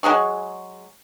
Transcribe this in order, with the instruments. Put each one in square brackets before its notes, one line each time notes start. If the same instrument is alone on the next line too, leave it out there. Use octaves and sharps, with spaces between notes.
[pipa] F#3 G#3 G#4 C#6